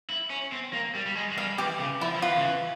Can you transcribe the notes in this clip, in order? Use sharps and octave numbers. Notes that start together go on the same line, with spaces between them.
E4
C#4
C4
A#3
G3
G3
G#3
G#3
G3 F5
E3 G4
C#3
F3 E4
F3
E3 F4
C#3
E3